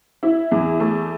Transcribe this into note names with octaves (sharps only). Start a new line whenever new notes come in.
E4
E2
A3